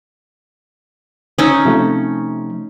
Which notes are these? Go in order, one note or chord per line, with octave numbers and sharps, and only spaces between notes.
C#4 D#4 D#6 E6
C3 F3 A3